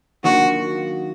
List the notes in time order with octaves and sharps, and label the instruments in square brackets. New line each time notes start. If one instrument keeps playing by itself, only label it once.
[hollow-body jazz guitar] D#3 F#3 A#3 D4 F4 [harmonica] F#4